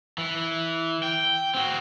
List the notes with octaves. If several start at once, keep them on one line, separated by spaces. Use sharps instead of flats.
E3
G5
C4 F#4